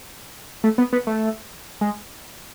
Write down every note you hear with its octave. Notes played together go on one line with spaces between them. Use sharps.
A3
B3
B3
A3
G#3